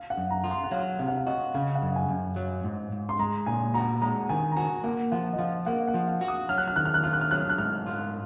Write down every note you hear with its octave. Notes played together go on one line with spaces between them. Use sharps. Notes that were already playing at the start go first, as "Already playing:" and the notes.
Already playing: F5
F#5
F#2
A#5
F4
C6
F#5
F#3 F5
C3 F5
F#5
F5
F#4 D#5
C#3 F5
F#5
F#2
G#5
F#2
F#3
G#2
G#2
C6
G#3 A#5
A#2 G#5
F#4 A#5
G#3 A#5
D#3 G#5
A#5
F#4 G#5
A#3 F#5
F3 F#5
D#5
F3 F5
A#3 F#5
F#5
F3
F5
F#4
D#6
F#3 F6
F#6
F6
D#3 F#6
F6
F#6
F4 F6
F#6
F6
F#3 F#6
F6
F#6
G#2 F6
F4